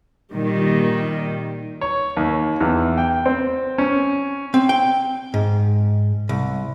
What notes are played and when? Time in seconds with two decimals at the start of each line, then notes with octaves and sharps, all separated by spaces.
0.33 A#2 D#3 G3
1.81 C#5
2.17 D#2
2.61 E2
2.98 G5
3.26 C4
3.78 C#4
4.54 C4
4.69 G5
5.34 G#2
6.29 C2